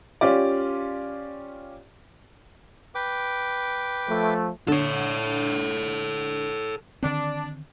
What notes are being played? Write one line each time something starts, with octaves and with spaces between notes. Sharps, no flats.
C#4 F4 G4 D5
B4 G5 D6
F3 A3
D3 A4 C#5
D3 D#3 C4 D4